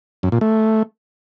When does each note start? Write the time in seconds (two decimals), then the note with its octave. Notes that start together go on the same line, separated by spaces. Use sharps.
0.23 F#2
0.32 A#2
0.41 A3